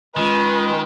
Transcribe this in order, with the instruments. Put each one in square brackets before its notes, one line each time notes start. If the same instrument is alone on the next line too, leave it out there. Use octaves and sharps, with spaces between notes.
[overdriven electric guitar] D#3 [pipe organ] G#3 C#4 F4 [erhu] B4